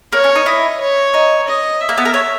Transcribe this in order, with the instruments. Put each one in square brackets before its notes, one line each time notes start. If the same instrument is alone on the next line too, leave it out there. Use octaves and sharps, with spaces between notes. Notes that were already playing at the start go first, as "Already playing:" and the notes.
[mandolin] A#3 [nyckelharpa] C#5
[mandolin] C#4
D#4
[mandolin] E4 [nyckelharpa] D#5
[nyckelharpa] C#5
[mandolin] D#4
[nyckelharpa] D#5
E5
[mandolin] A#3
B3
A#4
C#5